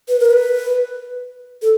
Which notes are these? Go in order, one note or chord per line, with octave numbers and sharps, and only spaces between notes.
B4
A#4
B4
A4